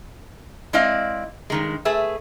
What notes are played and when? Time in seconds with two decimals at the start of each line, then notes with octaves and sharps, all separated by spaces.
0.73 G#3 C4 E4 D5 D#5 F5
1.50 G2 D#3 G#3
1.85 A3 G#4 B4 E5